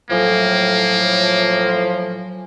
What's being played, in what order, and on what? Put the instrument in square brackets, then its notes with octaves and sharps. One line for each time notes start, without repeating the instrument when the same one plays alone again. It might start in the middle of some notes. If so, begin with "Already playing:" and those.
[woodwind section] A2 [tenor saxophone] F3 [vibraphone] F#3 G#5 [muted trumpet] A#3